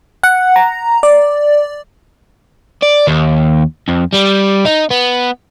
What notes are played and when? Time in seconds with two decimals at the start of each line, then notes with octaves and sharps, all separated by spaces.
0.23 F#5
0.56 A#5
1.03 D5
2.82 D5
3.07 D#2
3.88 F2
4.13 G3
4.65 D#4
4.91 B3